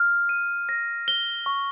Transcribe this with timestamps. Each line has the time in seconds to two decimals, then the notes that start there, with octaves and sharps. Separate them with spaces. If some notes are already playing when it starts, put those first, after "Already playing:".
Already playing: F6
0.29 D#7
0.69 A#6
1.08 G7
1.46 C#6